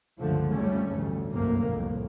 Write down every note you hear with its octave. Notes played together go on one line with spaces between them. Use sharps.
C#2 G2 D3 F3 A3
F2 G3 A3 C#4
A1 D2 G2
G1 C2 F#2 C3 A3 A#3
C2 F2 A2